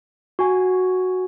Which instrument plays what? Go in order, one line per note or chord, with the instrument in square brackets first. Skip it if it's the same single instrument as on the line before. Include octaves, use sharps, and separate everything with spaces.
[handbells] F#4 G#5